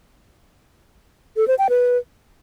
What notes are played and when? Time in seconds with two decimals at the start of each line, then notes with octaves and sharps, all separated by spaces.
1.37 A4
1.48 C5
1.58 G5
1.69 B4